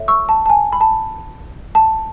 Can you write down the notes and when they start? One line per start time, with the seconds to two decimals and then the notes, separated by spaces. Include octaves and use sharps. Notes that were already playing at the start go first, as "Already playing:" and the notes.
Already playing: A4 C#5 E5
0.08 C#6 E6
0.29 A5
0.46 A5
0.50 G#5
0.72 B5
0.81 A5
1.75 A5